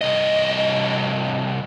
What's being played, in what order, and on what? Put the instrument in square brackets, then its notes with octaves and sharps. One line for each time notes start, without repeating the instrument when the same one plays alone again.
[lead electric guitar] C2 D#5